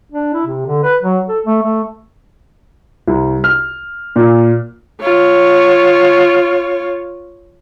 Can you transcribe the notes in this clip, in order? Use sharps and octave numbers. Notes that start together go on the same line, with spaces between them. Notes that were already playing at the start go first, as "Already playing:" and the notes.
D4
E4
C3
D3
B4
F#3
A4
A3
A3
C2
F6
A#2
F4 C#5